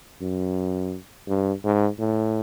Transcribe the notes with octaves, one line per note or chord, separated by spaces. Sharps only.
F#2
G2
G#2
A2